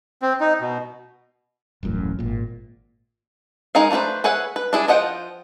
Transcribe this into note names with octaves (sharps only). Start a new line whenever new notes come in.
C4
D#4
B2
D#1 A1 F#2 A2
G#1 A#2
G#3 D#4 G#4 A#4 F5
A3 D4 F4 B4 C5
G#4 B4 C#5 E5 F#5
B4
D4 E4 G#4
F3 D#5 F#5 G5